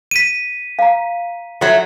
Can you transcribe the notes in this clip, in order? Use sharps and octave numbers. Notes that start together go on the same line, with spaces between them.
B6 D#7
F5 A#5
F#3 A3